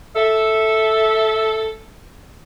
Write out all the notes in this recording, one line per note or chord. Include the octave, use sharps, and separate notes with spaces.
A4 E5